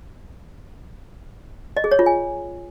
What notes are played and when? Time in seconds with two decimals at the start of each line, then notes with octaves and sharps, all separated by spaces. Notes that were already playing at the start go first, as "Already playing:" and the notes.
1.77 D#5
1.84 G#4
1.91 C#5
1.99 F4
2.06 G#5